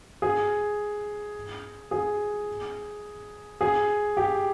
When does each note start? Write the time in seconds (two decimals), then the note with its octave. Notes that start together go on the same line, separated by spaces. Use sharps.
0.22 G#4
1.91 G#4
3.61 G#4
4.17 G4